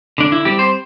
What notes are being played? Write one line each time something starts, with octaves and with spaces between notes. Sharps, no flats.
D3 D4
E4
G3 C4 G4
C5